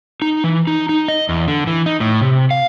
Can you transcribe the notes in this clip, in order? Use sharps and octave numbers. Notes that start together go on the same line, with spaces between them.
D#4
E3
D#4
D#4
D#5
E2
D3
E3
D#4
A2
C3
F5